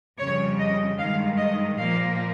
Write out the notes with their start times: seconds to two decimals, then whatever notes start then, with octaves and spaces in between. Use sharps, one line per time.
0.19 F2 C#3 G3 C#5
0.59 D#5
0.98 G2 D#3 G#3 F5
1.37 D#5
1.77 A#2 F3 A#3 F5